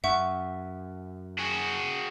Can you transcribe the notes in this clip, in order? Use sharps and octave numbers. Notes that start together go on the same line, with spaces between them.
F#2 E5 F#5 C#6
F#4 G#4